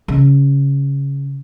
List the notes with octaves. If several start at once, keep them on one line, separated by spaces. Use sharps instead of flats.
C#3